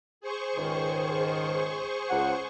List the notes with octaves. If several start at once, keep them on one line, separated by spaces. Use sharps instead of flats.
G#4 C5 C#6
C#2 G#2 D#3
C#2 F#5